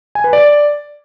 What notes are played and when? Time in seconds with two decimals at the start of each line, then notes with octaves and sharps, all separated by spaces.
0.15 G#5
0.24 B4
0.33 D5